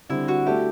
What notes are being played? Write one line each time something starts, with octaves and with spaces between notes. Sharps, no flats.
D3 G3 C4 E4
F#4
A3 D4 G4 A4 E5